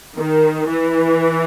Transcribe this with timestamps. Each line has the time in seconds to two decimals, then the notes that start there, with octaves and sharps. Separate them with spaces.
0.17 D#3
0.68 E3